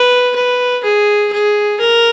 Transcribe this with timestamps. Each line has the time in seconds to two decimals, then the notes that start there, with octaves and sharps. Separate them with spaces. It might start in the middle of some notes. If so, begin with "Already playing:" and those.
Already playing: B4
0.35 B4
0.84 G#4
1.32 G#4
1.80 A#4